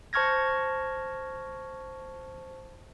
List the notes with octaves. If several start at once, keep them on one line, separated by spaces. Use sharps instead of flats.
C5 A5 C#6 F6 G#6 A#6